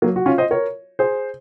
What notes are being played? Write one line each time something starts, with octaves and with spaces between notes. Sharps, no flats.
F#3 A#3
F#4
C#4 F4
C5 D#5
A#4 C#5
G#4 C5